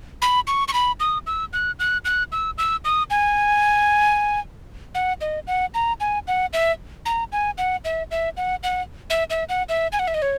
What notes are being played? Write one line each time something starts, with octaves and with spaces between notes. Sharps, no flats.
B5
C#6
C#6
B5
D#6
E6
F#6
F#6
F#6
E6
E6
D#6
G#5
F#5
D#5
F#5
A#5
G#5
F#5
E5
A#5
G#5
F#5
E5
E5
F#5
F#5
E5
E5
F#5
E5
G#5
F#5
E5
D#5
C#5